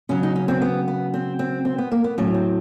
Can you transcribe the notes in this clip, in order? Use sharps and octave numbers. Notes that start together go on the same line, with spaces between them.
C#3 F#3 C#4
D#4
C#4
C4
B3
B3
C4
C4
C4
B3
A#3
B3
A2 F#3 C#4
C4